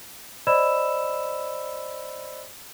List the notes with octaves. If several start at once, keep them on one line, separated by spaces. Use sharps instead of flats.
C5 D5 D#5 B5 E6 E7